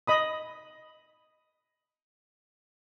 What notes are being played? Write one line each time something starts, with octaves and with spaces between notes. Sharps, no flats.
D#5 B5 D#6